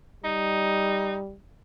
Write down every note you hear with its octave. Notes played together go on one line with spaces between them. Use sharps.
G3 D#4